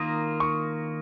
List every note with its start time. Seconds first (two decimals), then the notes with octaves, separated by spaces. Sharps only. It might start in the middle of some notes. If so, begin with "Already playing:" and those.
Already playing: D#3 A#3 F4 D#6
0.40 C#6